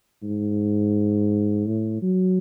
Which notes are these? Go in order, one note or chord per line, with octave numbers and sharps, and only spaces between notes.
G#2
A2
F#3